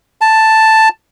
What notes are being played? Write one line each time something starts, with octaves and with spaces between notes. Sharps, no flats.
A5